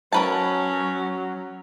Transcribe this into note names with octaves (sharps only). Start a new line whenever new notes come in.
F#3 C#4 A#4 B4 A5